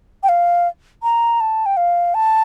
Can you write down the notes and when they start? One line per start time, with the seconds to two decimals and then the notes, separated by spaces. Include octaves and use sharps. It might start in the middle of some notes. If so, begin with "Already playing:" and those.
0.23 G5
0.29 F5
1.03 A#5
1.41 A5
1.66 G5
1.77 F5
2.14 A5